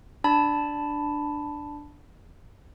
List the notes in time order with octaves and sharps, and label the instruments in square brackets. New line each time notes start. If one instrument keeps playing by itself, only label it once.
[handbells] D4 A5 B5